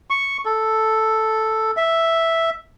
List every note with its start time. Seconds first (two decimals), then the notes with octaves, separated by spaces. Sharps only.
0.10 C#6
0.45 A4
1.77 E5